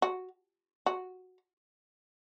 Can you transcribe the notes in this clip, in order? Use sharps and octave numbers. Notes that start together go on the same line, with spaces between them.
F#4
F#4